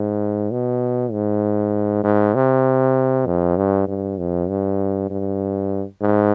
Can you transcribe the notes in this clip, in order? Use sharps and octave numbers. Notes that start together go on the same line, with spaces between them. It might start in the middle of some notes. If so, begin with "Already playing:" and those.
Already playing: G#2
B2
G#2
G#2
C3
F2
G2
G2
F2
G2
G2
G#2